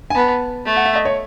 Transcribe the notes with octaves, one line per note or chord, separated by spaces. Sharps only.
G#5
B3 A5
A3
F#5
E5
D#5
C#5